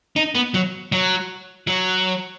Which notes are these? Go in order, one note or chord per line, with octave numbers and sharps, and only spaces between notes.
D#4
B3
F#3
F#3
F#3